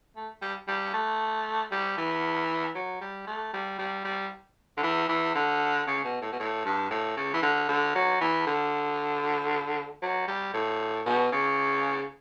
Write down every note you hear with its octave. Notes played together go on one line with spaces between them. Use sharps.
A3
G3
G3
A3
G3
E3
F#3
G3
A3
G3
G3
G3
D3
E3
E3
D3
C#3
B2
A2
B2
A2
G2
A2
C#3
E3
D3
D3
F#3
E3
D3
F#3
G3
A2
B2
C#3